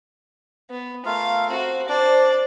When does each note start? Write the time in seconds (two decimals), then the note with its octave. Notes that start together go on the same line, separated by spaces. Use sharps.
0.70 B3
1.05 A3 F4 A#4 F5
1.49 C4 F#4
1.89 D4 C5 D5